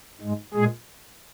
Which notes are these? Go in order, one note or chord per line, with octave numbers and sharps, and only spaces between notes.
G#2 G#3
A#2 G#3 G#4